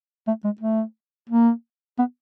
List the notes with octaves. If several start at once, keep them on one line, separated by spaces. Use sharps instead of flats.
A3
G#3
A3
A#3
B3